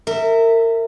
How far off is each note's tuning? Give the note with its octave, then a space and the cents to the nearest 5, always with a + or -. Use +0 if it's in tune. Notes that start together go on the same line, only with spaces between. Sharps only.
A#4 -30 E5 -5